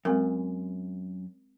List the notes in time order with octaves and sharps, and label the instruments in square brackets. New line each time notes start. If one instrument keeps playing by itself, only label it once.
[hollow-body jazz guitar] F#2 [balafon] G#3 C4 A#4